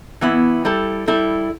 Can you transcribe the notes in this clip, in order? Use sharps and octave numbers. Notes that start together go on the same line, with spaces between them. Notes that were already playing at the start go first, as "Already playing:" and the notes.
E3 B3 E4
G3 E4 A4
G3 E4 A4